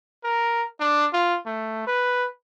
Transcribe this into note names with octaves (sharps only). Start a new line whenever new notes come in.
A#4
D4
F4
A3
B4